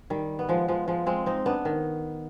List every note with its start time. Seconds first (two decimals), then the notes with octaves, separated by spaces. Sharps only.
0.10 D#3 G3
0.39 B3
0.49 F3 G#3
0.68 F3 G#3
0.88 F3 G#3
1.06 G#3 C4
1.26 C4 D#4
1.46 B3 D4
1.65 D#3